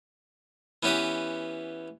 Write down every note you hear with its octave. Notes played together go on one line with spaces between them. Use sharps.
E3 B3 C#4 G4 B4 D#6